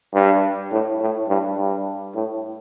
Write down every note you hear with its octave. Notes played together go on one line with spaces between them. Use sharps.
G2
A2
A2
G2
G2
A2